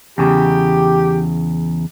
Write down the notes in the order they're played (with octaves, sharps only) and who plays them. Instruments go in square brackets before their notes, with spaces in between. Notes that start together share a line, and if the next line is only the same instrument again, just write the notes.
[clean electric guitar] E2 C#3 [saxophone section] G4